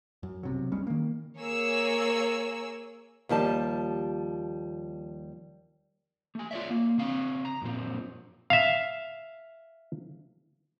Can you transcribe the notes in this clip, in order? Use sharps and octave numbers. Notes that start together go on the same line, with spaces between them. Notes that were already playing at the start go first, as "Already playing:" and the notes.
F#2
B1 C3 F#3
F1 G3 G#3 C#4
D#3 A#3
A#3 G#4 C#5 E6
D#2 F3 G3 A5
A3 G#5
F4 C#5 D5 E5
A#3
C#3 C4 F5
A#5
F#2 A#2 F3 C4
E5 F5